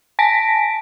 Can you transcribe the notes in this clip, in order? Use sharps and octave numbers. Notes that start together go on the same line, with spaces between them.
G#5 A5 A#6 B6 D7